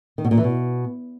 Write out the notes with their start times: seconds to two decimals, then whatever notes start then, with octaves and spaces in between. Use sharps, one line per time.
0.18 D#3
0.25 B2
0.31 A#2
0.38 E3
0.44 B2